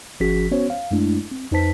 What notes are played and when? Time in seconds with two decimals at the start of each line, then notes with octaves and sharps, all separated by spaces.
0.20 G1 F3 C#4 F#4 G#4 B6
0.51 B3 C#4 F#4 C5 C#5
0.70 F5
0.91 F#2 G#3 A3 D4 E4
1.31 C4
1.51 F2 D#4 B4 C5 A5 B6